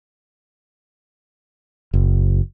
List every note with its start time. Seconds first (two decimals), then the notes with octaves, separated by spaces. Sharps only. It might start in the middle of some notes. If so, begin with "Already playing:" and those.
1.94 F#1